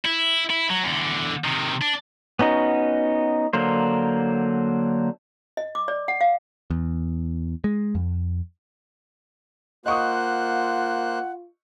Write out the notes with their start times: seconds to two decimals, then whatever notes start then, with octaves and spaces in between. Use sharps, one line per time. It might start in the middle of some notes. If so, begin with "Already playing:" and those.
0.05 E4
0.50 E4
0.70 F#3
0.84 E2 D3
1.44 C3 D#3
1.81 D4
2.39 B3 C#4 D#4 F#4
3.53 D3 F#3 A#3 C5
5.57 D#5
5.75 D6
5.88 D5
6.08 F#5
6.21 F5
6.70 E2
7.64 G#3
7.95 F2
9.86 A#3 F4 C5 D#5 F#5 C#6 D#6 F#6